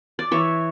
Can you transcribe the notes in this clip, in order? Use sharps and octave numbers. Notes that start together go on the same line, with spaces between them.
D5
E3 C#5 E5